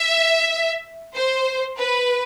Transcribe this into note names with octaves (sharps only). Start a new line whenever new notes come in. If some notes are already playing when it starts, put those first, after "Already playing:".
Already playing: E5
C5
B4